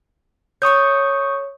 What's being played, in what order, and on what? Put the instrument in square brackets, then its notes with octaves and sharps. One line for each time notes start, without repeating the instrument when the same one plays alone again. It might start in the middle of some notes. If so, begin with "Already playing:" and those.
[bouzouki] A4 C#5 [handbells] C#6 D#6 G6